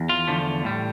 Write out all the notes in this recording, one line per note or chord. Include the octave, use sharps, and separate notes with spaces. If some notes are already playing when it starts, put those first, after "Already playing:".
Already playing: E2
F4
E2 D3 F3 A3
A2 G3